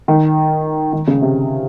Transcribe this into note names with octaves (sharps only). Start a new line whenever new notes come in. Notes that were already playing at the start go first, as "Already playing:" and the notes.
D#3
D#3
C#3
C3